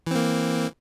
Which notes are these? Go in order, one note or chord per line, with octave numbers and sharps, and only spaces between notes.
E3 A#3 C4